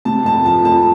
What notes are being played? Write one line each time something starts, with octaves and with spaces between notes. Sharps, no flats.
C3 A5
F2 A5
F3 A5
F2 A5